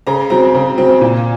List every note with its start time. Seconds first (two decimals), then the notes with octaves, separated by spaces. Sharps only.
0.07 C#3 A#5
0.30 F#3 C4 A#5
0.55 C#3
0.78 F#3 C4
1.01 A#2